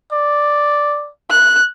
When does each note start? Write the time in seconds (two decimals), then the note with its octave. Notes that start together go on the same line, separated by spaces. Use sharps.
0.13 D5
1.30 F#6